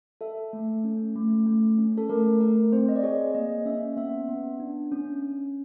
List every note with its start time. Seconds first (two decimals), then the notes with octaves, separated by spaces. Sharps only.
0.21 A4 E5
0.53 A3
0.84 C#4
1.16 A3
1.46 A3
1.78 C#4
1.97 A4
2.09 A3 A#4
2.41 A3 A#4
2.72 C4 C5
2.89 D#5
2.96 D5
3.03 G#4 C#5
3.35 A#3 D#5
3.66 C#4 E5
3.97 B3 E5
4.29 B3
4.60 D4
4.92 C#4
5.22 C#4